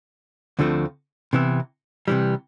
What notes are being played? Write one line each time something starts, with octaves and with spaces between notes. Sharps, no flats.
D2 D3 F3 A3 C4
C3 E3 B3 E4
C3 E3 G3